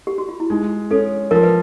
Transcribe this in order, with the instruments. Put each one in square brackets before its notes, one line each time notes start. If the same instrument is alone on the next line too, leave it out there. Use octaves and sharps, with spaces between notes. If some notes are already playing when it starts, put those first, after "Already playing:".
[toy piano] G4
F#4
F4
E4
[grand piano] G#3 [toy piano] D#4
[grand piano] C#4 [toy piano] A4
[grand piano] F3 [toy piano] A#4
[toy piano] B4